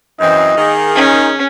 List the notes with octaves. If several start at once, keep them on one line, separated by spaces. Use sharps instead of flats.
F#2 E3 C4 D#5
D#3 A#3 G#4
C#4 D#4